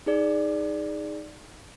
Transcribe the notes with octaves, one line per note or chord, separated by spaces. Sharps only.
D#4 G#4 D5